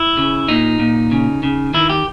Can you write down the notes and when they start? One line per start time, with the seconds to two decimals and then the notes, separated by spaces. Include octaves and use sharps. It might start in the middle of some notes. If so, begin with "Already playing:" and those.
Already playing: E4
0.18 C#3
0.48 A#2 D#4
0.79 A#2
1.11 C#3
1.43 C#3
1.74 D#3 E4
1.90 G4